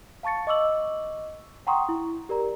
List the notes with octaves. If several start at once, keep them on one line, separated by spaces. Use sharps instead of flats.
F5 A5 C#6 A6 C#7
D#5 C#6 D6 E6 F#7
F#5 G5 A#5 C6 C#6 D#6
E4
G4 A#4 D5 A#5